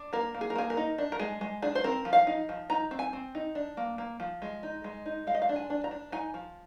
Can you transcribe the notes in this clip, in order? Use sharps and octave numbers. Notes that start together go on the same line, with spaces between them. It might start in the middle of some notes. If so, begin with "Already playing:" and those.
Already playing: D4
A#3 A#4
A#3
G#4
A#4
A#3 G#4
A#4
D#4
D4
A#4
G#3 G#4
G#3
D4 G#4
C5
C4 A#4
F3
F5
D#4
F3
D#4 A#5
C4
G#5
C4
D#4
D4
A#3
A#3
F3
G#3
D#4
G#3
D#4
G#3 F5
D#5
F5
D4
G#5
D4
A#5
D4
D#4 G#5
F3